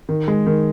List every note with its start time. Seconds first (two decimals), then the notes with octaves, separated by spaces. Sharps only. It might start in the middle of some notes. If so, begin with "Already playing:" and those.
0.09 D#3
0.28 G#3
0.47 D#3